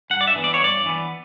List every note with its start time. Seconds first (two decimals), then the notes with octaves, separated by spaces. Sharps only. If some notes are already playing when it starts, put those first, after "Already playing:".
0.10 G2 F#5
0.21 D5
0.27 E5
0.36 E3 B3
0.44 D5
0.54 C#5
0.61 G2 D5
0.86 E3 B3